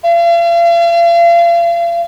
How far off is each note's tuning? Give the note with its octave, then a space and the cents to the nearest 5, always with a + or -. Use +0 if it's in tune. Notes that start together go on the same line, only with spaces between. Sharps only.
F5 -40